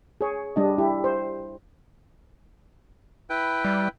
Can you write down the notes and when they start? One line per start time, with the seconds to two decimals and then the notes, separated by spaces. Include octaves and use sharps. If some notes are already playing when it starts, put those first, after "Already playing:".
0.21 G#4 C#5
0.56 G3 D4 D#5
0.78 E4 G4
1.04 C5
3.30 E4 B4 G5
3.65 G3